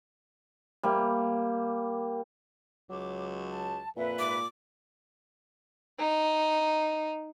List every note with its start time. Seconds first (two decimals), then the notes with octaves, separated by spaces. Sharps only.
0.83 G3 A#3
2.90 C#2 F#3 D6
3.47 A5
3.96 F2 A#2 B4 E5
4.19 G#2 D6
5.99 D#4